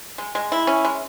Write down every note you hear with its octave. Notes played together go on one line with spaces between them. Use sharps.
G#3
G#3
E4
C#4
G#3